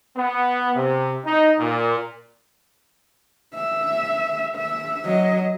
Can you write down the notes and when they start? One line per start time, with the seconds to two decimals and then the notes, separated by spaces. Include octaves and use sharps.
0.16 B3
0.74 C3
1.25 D#4
1.59 A#2
3.54 E5
4.56 E5
5.05 F#3 D#5